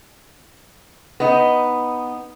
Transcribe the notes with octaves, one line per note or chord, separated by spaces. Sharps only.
B3 D#4